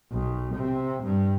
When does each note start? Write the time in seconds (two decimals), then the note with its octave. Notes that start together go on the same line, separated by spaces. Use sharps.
0.11 B1
0.55 C3
1.03 G2